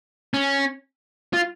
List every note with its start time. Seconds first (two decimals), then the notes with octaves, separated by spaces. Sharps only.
0.34 C#4
1.33 F4